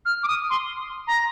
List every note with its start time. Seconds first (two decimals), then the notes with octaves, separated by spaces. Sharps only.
0.05 F6
0.23 D6
0.28 D#6
0.50 C6
1.07 A#5